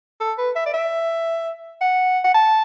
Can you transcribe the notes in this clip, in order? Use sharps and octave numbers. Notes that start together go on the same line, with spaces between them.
A4
B4
E5
D5
E5
F#5
F#5
A5